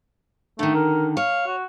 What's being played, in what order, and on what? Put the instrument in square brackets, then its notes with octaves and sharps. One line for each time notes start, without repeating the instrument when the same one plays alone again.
[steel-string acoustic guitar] D3 D#3 [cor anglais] A3
[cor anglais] A#4
[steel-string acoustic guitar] C#5 [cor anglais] F5
[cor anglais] F#4